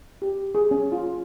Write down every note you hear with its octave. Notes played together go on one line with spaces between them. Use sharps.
G4
G#4
C#4
F4